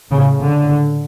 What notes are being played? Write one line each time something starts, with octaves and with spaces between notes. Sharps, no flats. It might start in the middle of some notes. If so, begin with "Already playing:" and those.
A2 C#3
D3